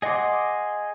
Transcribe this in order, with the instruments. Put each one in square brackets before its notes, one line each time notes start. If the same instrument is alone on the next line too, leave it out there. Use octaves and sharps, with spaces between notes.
[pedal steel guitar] G#4 D#5 F#5 C6 D6